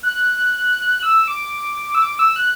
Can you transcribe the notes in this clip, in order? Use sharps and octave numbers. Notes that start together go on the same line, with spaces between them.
F#6
E6
D6
E6
D6
E6
F#6